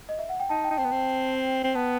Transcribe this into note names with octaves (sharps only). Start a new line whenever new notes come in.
D#5
E5
F#5
G5
D#4 A5
G5
D#4
C4 G5
B3
C4
C4
B3 A5